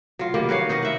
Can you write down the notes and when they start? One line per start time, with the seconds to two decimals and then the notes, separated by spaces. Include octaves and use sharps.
0.19 F#3 F4
0.34 D#3 G3 A#3
0.49 F#4 B4 C#5 F5
0.69 D#4 F#4 B4 D#5
0.82 E5 F#5